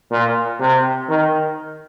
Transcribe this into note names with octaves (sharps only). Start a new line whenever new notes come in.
A#2
C3
D#3